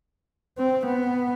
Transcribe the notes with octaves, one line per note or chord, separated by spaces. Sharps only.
C4
B3